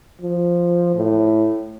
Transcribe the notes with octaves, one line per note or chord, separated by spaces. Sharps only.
F3
A2